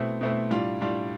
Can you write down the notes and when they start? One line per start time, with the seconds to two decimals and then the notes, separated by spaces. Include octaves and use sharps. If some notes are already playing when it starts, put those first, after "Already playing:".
Already playing: B2 A3 C4 E4
0.21 B2 A3 C4 E4
0.50 A2 G3 D4 F4
0.81 A2 G3 D4 F4